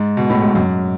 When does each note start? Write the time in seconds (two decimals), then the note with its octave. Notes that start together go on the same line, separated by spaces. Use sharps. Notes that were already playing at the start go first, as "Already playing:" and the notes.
Already playing: G#2
0.17 B2
0.30 A2
0.42 G#2
0.55 F#2